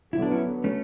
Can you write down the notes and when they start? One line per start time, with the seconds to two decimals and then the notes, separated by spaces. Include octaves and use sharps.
0.12 D3 F#3 B3 E4
0.22 D4
0.31 C#4 E4
0.64 A3 C#4